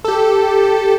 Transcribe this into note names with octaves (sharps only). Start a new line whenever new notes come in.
G4 A4